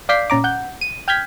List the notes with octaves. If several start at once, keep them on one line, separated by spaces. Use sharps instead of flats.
D5 F5 D6 G6 B6 C7
A#2 C#4 A#5 D6
F#5 G6
D#7
G5 F6 G6 G#6 B6